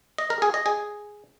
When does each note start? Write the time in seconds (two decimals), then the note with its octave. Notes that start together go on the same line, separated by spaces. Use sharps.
0.18 D#5
0.30 A#4
0.42 G#4
0.54 D#5
0.66 G#4